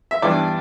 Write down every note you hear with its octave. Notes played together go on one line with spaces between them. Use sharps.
E5
G2 E3 B3 D4 D5